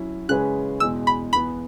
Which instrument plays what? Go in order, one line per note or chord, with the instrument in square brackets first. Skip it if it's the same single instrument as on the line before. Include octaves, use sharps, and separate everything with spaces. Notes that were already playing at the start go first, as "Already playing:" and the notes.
Already playing: [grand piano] F#3 C#4 E4
[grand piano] C#3 G#3 C#4 G#4 B4 [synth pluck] F#6
[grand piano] E2 B2 G#3 [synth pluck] E6
[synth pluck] B5
[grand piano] E2 E3 B3 [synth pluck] B5